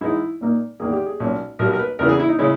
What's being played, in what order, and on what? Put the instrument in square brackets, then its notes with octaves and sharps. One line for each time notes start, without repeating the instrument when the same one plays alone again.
[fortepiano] G#2 E3 G#3 D#4 E4
A#2 A#3 D#4
E2 D#3 A#3 G#4
G4
G#4
B1 A#2 A#3 C#4
B1 B2 G3 A#4
A#4
B4
E2 C#3 E3 A#4
G#4
E4
D#4
C#3 G#3 C#4 E4